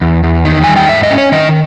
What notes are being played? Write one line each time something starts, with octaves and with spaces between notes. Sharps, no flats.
E2
E2
D#3
G3 G#5
G5
G#2 E5
D#5
C#4
C#5
D#3 D#5